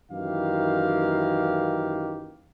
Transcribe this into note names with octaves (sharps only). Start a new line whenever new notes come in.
F#2 D#3 E3 A#3 G4 F5